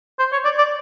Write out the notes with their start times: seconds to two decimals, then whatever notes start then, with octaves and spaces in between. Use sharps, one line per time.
0.19 C5
0.32 C#5
0.45 D5
0.58 D5